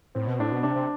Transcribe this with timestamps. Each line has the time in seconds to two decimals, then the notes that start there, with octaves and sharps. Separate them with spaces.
0.15 A2 C4
0.27 B2
0.39 A2 D4
0.52 B2
0.63 C3 D4
0.75 C3